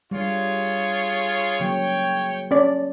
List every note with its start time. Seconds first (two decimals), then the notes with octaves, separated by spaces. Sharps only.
0.11 G3 F4 G#4 C#5
1.60 C#3 F#3 A#3 C#5 G5
2.51 C#4 D5